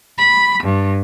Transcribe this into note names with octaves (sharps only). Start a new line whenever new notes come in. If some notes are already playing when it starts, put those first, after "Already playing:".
B5
G2